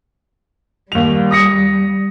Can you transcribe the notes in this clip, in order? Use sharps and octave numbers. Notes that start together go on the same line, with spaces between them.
D#2 G3 F7
D#6 A#6 C#7